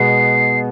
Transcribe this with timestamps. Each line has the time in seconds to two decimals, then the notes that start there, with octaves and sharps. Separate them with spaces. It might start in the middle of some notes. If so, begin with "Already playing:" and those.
Already playing: B2 G#3 B3 C7